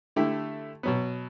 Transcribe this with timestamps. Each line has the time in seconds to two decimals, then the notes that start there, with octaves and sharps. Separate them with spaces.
0.16 D3 A3 E4 G4
0.83 B2 F#3 B3